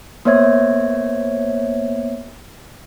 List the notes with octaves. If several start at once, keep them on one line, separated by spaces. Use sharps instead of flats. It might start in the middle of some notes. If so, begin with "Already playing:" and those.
A#3 B3 C5 C#5 E5 G#6